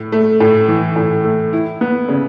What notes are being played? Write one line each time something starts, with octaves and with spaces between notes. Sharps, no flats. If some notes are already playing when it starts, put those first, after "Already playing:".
Already playing: A2
A3
A2
E3
A2
A3
E4
B3
C#3